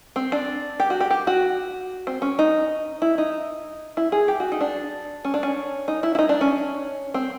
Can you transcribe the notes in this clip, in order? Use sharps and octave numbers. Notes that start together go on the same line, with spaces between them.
C4
D4
G4
F#4
G4
G4
F#4
C4
C#4
D#4
E4
D#4
E4
G#4
G4
F#4
D#4
D4
C#4
D4
C#4
D#4
E4
E4
D#4
D4
C#4
C4